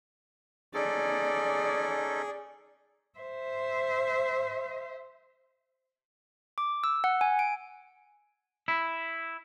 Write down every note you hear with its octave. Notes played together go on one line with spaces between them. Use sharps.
C#4 D#4 G#4 A4 D5
C5 E5
D6
E6
F#5
G#5
D7
E4